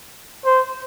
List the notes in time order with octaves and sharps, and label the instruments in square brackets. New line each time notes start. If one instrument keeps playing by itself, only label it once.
[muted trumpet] C5